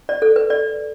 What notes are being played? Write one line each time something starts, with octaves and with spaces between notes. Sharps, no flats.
D5
A4
B4
D5